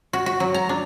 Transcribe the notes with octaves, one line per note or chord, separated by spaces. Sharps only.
F#4
F#4
F#3
A#5
D4